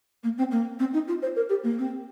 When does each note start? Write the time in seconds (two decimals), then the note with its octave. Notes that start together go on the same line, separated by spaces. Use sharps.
0.23 A#3
0.37 C4
0.51 A#3
0.79 C4
0.93 D#4
1.07 F4
1.22 C5
1.36 A#4
1.49 G4
1.63 A#3
1.78 C4